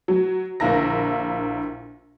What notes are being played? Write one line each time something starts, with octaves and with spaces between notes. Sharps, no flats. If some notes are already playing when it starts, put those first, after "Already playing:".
F#3
A#1 D3 A#3 E4 A#4 A#6